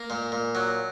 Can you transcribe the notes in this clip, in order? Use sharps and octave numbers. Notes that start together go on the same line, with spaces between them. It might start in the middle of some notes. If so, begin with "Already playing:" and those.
Already playing: A#3
A#2
A#2
F#3